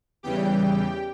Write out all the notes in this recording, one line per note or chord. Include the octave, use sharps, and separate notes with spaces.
E2 C#3 E3 G3 G4 G5